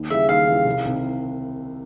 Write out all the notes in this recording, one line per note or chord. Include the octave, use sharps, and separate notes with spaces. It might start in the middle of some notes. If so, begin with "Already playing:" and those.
Already playing: D#2
C#3 E3 G3 E5
D#2 F5
C#3 E3 G3
C2
C3 D#3